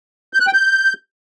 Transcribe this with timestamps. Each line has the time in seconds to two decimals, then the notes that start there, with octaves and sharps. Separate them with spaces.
0.33 G6
0.40 F#6
0.47 G5
0.53 G6